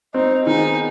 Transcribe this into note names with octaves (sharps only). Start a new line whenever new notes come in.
C4 D#4
D#3 B3 D#4 G#4